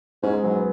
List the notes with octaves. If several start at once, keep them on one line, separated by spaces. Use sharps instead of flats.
G#2 C#4
G#3
G#2 F#3
B3